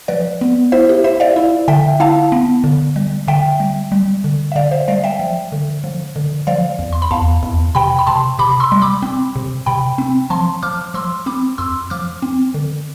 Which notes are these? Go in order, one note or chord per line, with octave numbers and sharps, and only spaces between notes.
F3 B4 D5
B3
E4 C5 E5
G4
E4 C5 E5
D5 F5
E4
D3 E5 G5
E4 F5 A5
B3
D3
G3
D3 E5 G5
G3
G3
D3
E5
D3 D5 F5
C5 E5
G3 D5 F5
E5 G5
F3
D3
F3
D3
F3 D5 F5
E2
C6
B5
E2 F5 A5
E2
C3 G5 B5
B5
C3 A5 C6
C3 B5 D6
C6 E6
G3
B5 D6
C4
C3
C3 G5 B5
C4
F3 A5 C6
F3 D6 F6
F3 C6 E6
C4 B5 D6
F2 C6 E6
F3 D6 F6
C4
D3